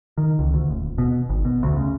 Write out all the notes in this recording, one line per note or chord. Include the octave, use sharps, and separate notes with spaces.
D#3
C#2
D2
D#1
B2
G#1
B2
D2
C#3